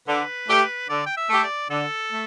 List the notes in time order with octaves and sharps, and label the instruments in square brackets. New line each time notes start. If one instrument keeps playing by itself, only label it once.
[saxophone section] D3 [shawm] B4
[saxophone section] A3 G4
[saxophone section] D3 [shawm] D5
[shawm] G5
E5
[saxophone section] A3 G4
[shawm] D5
[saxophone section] D3 [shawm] A4
[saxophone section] A3